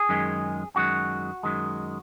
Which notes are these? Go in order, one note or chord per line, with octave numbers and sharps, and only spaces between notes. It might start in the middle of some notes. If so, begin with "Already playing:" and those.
Already playing: G#4
F#2 D#3 G#3
F#2 D#3 G#3 F#4
F#2 D#3 G#3